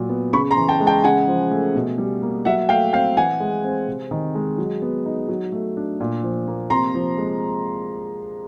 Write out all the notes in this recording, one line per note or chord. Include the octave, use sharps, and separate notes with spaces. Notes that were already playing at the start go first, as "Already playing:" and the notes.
Already playing: A#2 F#3
B3
C#3 B5 C#6
A#5 C6
E3
G5 A5
G#3
G5 A5
C#3 F#5 G#5
F3
A3
B2
G3
A#3
F#3 E5 F#5
A3 F5 G5
C4 F5 G5
E3 F#5 G#5
G#3
C4
C3
D#3
G#3
F#3
B3
D#4
F#3
A3
D4
A#2
F3
A#3
C3 A#5 C6
F3
G#3